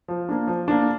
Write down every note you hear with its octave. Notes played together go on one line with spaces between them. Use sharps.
F3
A#3 D4
F3
A#3 D4